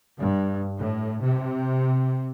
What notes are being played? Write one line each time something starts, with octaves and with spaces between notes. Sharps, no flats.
G2
A2
C3